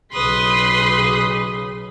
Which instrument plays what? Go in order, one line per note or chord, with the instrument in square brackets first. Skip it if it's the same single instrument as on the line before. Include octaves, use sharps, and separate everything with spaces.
[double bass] B1 C#3 [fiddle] B4 D#6 [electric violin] C6 B6